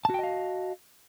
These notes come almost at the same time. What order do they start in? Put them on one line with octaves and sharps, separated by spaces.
A5 F#4 G5 D#5 F5